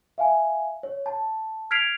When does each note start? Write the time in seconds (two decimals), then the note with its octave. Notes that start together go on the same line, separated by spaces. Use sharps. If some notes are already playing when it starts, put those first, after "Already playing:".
0.18 E5 F5 G#5
0.83 C#5
1.06 A5
1.71 F6 G#6 B6 C7 D7 F7